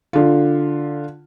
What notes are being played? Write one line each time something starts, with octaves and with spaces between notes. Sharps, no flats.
D3 F4